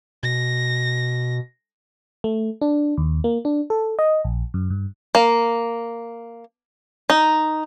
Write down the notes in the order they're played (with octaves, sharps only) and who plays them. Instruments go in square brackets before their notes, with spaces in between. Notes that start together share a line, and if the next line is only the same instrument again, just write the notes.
[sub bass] B2 [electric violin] A#6
[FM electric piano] A3
D4
D#2
A#3
D4
A4
D#5
A#1
F#2
G2
[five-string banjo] A#3
D#4